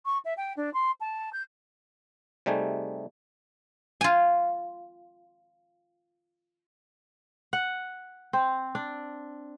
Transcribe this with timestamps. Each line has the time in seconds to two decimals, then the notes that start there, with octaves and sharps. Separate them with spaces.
0.05 C#6
0.25 E5
0.37 G5
0.56 D4
0.73 C6
1.00 A5
1.32 G6
2.46 C3 G3 A3 D#4 G#4
4.01 F4 G#5
7.53 F#5
8.33 C4
8.75 D4